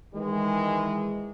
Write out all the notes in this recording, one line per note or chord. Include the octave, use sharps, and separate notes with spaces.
D#3 E3 G#3